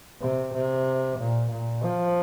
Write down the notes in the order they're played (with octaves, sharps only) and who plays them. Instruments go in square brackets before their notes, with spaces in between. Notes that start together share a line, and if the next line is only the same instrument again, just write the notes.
[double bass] C3
C3
A#2
A#2
F3